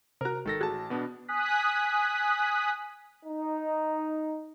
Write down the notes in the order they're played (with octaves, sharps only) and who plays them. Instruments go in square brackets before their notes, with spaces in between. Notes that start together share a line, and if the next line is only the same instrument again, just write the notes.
[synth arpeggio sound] C3 F#4 [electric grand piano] A#4 A#5
[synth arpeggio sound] G#1 [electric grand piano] D#3 A4 A#6
[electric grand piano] A1 A5 [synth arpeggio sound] F#4 G#4
[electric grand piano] B2 B3 D4
[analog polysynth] G#5 D#6 F#6 B6
[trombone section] D#4